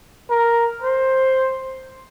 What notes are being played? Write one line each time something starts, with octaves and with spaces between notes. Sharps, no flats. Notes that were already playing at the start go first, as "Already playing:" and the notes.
A#4
C5